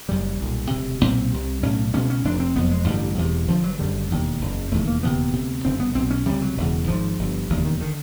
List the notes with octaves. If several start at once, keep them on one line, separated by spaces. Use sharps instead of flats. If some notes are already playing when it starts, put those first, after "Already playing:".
F#1 F#2 C#3 G3
B1 A#2
E1 D2 C3
B1 A#2 C4
C2 C3
B1 A2 C#4
C#2 B2 C#4
C#4
F1 F2 C3 D4
C4
F#1 F2 C3 B3
G#3
A1 G2 D3 G3
E1 E2 C3
G1 G2 D3 F3
F#3
F#1 F#2 D3 G3
E1 D#2 D3
F#1 E2 C#3
E1 D#2 C#3 A3
A#3
E1 D#2 C#3 B3
D2 C3
G1 F#2 C#3 C4
B3
B1 B2 C4
C#4
C#2 C3 G3
F#3
E1 E2 C#3
G#1 G#2 F3
G1 G2 D3
E1 D#2 C#3
D#3
D3 D#3